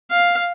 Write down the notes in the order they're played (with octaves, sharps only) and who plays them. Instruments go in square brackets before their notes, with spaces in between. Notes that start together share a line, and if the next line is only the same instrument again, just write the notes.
[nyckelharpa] F5